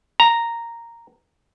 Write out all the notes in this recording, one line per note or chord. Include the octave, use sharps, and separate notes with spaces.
A#5